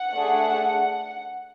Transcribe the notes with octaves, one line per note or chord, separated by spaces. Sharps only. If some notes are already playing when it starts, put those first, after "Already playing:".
Already playing: F#5
A3 D4 G#4